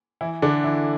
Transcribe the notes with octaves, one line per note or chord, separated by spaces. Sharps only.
E3 E4
D3 D4
E3 E4